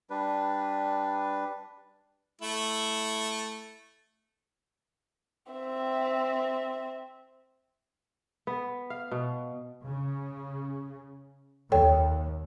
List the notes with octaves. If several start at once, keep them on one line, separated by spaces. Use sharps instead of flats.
G3 D4 B4
A3 E4
C4 E5
B3
F5
B2
C#3
D#2 A4 C#5 G5